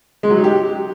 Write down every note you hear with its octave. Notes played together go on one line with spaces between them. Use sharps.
G#3
F#3
D#4
G4